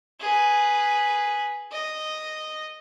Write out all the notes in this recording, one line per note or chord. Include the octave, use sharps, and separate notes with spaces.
G#4 B4
D#5